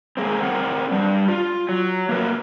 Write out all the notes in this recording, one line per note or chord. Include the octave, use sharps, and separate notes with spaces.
G#3 A#3 C4
C4 A#4 F#5
G3 D4
F4
F#3
A#3 B3 E4 A#4 B4